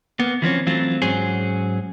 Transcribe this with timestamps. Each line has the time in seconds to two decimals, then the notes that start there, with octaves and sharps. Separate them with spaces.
0.20 A#3 B3
0.42 E3 F3 C4 C#4
0.67 E3 F#3 A3 C4 F4
1.02 G#2 F#3 C#4 G#4 C5